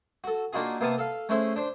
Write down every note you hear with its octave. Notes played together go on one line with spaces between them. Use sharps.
F#4 A4
A#3 D4 D#4 F4 F#4 G#4
C3 A#3 B3 F5 A5 D#6
A4 F5
A3 C#4 E4 G#4 C5
D4 C5